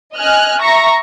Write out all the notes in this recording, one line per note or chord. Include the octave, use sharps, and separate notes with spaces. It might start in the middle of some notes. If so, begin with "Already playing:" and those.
D#5 G#5 F6 F#6
E5 A#5 C#6 A#6